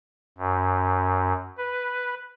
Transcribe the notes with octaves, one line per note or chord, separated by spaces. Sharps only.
F#2
B4